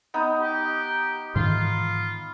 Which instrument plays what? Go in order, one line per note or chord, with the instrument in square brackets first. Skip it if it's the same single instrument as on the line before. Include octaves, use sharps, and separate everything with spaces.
[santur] B3 D#4
[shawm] G4
[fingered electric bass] G#2 D#3 E3 [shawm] F4